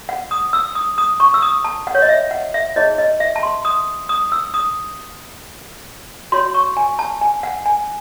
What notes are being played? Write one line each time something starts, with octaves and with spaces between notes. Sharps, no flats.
F#5
D#6
E6
D#6
D#6
C#6
E6
D#6
A5
F#5
C#5
D#5
E5
F#5
E5
D#4 G#4 C#5 D#5
D#5
E5
A5
C6
D#6
D#6
E6
D#6
F#4 C#5 C6
C#6
G#5
A5
G#5
F#5
G#5